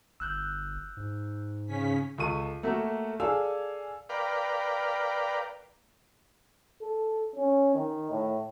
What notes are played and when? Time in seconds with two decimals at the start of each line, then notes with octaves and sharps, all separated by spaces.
0.20 G1 E6 F#6 G6
0.97 G#2
1.66 C#3 C#4 B6
2.18 C#2 A4 C#6 D#7
2.63 A3 A#3 F#4 E5
3.20 G#4 A4 D5 F5 G#5 E6
4.09 A#4 B4 D5 F5 G5
6.81 A4
7.36 C#4
7.74 D#3
8.10 A2